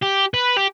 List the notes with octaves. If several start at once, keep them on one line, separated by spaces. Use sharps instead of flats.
G4
B4
G4